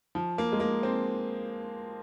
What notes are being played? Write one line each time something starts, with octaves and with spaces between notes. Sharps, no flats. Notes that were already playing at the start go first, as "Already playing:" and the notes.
F3
A#3
G#3
A#3
C4